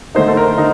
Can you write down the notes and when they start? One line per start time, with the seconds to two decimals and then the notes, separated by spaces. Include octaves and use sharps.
0.15 D3 A3 D#4 C5
0.28 A4
0.37 A#4
0.58 D3 D#4